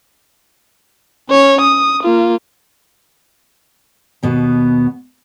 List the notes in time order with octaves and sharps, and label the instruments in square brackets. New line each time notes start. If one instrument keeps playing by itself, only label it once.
[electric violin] C#4 C#5
D#6
A#3 F4
[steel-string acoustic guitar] D#2 B2 B3